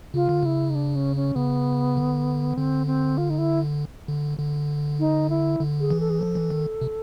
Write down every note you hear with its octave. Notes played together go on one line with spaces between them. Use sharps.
C#3 F4
D3
C#3 E4
D#4
D4
C#4
C#4
C#3 B3
D3
D3 C4
C4
F4
D#4
E4
D3
D3
D#4
E4
D3
G#4
E3
A4
G#4
F3 A4
E3
D#3
C3